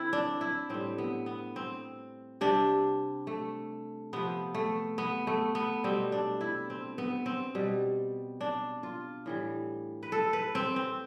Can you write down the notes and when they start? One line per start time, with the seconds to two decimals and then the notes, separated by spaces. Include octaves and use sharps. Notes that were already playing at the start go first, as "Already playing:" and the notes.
Already playing: D3 C4 E4
0.13 D4
0.41 E4
0.70 A2 G3 C4
0.98 B3
1.26 B3
1.56 C4
2.41 C3 G3 D4
3.27 A3
4.13 C3 F3 B3
4.55 A3
4.98 B3
5.27 A3
5.55 B3
5.84 B2 G3 C4
6.12 D4
6.41 E4
6.70 C4
6.98 B3
7.26 C4
7.55 B2 G3
8.41 D4
8.83 F4
9.26 A2 E3 G3
10.03 B4
10.12 A4
10.33 B4
10.55 C4
10.76 C4